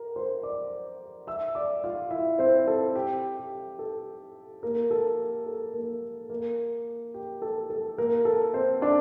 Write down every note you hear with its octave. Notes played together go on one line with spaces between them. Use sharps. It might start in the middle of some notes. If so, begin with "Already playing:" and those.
Already playing: A#4 A#5
C5 C6
D5 D6
E5 E6
D5 D6
F4 F5
E4 E5
C4 C5
A4
G4
G4
A4
A#3 A#4
A4
G4
A4
A#3 A#4
A#3 A#4
G4
A4
A4
A#3 A#4
A4
C4 C5
D4 D5